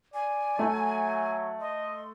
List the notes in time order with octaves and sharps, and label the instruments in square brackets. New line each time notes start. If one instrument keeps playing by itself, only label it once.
[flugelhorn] D5 [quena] G#5
[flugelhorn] F#3 [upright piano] A3
[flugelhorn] D#5 [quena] C6